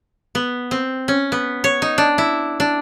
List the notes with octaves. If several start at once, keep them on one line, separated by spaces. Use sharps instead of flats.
B3
C4
C#4
B3
C#5
D#4
D4
E4
D4